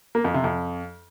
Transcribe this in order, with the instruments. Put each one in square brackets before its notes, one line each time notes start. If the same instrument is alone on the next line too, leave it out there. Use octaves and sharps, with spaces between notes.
[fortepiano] A#3
F2
C3
F2